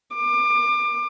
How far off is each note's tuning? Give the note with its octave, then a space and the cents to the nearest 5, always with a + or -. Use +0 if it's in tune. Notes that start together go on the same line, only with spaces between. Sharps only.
D6 +30